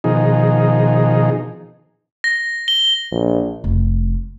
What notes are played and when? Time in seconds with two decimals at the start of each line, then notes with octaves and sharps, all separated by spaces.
0.04 B2 D#3 F3 D#4 G#4
2.24 A#6
2.68 G7
3.12 A#1
3.64 F1